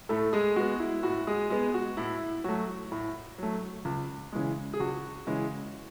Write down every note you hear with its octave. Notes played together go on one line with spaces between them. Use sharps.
A2 A3 A4
G#3 G#4
G#3 B3 F#4
E4
A2 F#4
G#3 G#4
G#3 B3 G#4
F#4
A2 E4
F#3 A3 F#4
A2
F#3 A3
C#2
C#3 E3 G#3
G#4
C#2 F#4
C#3 E3 G#3